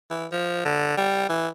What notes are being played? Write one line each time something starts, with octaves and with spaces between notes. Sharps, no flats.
E3
F3
D3
G3
E3